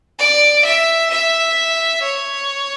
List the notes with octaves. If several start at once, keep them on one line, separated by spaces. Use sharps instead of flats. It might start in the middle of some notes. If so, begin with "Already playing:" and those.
D5
E5
E5
C#5